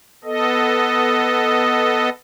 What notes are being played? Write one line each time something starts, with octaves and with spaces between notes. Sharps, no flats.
B3 A4 D#5